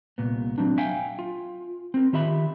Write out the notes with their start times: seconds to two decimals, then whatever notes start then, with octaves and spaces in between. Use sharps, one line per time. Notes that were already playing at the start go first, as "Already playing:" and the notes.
0.18 C2 A#2 B3
0.58 F#3 C4 D4
0.78 E5 F5 G5 G#5
1.19 F4
1.94 C4 A#4
2.13 D#3 F4 G4 E5 B5